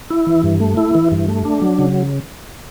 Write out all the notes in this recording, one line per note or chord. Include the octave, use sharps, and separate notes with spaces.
E4
E3
G2
A3
E4
E3
G2
A3
D4
F#3
C#3